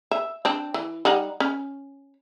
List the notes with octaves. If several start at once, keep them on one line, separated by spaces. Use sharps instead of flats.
E5
C4 D4
E3
G3 D#4 F#5
C#4